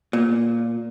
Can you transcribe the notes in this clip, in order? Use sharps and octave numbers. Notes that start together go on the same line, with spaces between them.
A#2